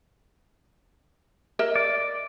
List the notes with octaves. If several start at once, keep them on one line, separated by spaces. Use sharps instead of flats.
A#4 D#5 E5
D5